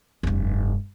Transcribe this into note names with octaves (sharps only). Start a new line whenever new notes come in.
F1 G2